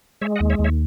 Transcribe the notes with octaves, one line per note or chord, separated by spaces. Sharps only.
G#3 C#5 E5
D#5 F#5
D#2
C#5 E5
D#2
C#5 E5